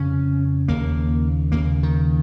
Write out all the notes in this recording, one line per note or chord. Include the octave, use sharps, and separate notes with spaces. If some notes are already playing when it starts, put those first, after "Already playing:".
Already playing: F2 C#3 C#4
D#2 C#3 A#3
D#2 C#3 A#3
D#3